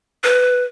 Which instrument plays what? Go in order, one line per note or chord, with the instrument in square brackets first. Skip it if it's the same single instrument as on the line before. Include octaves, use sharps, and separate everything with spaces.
[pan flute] B4